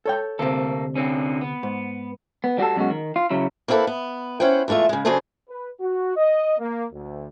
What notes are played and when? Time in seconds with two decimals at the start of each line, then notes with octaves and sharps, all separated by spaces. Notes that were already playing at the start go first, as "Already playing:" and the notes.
0.05 A4 C#5 G5
0.39 D2 C3 A#3 A4
0.95 D3 C4 C#4
1.41 B3
1.63 G#2
2.44 B3
2.58 G3 F#4 G4 A4
2.76 F#2 B2 G#3 C#4 F#4
2.90 D#3
3.16 F4
3.30 C#3 F#3 E4
3.68 A#3 C4 E4 F4 A4 B4
3.87 B3
4.40 C#4 E4 C5 F#5 G5
4.68 E2 G#3 A3 F4 E5
4.89 C#3 G#3
5.05 C#3 F#3 D4 G#4 A4 C5
5.49 B4
5.80 F#4
6.16 D#5
6.58 A#3
6.92 D2